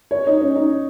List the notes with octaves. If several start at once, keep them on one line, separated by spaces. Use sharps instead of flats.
C#5
D#4
C#4
D#4